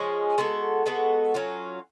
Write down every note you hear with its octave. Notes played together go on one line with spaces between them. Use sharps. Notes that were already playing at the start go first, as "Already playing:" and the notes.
Already playing: F3 G#3 C#4 G#4
G#3 B3 F#4 A4
G#3 B3 F#4 A4
F#3 C#4 F4